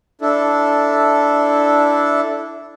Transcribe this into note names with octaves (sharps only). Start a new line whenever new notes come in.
D4 E4 A4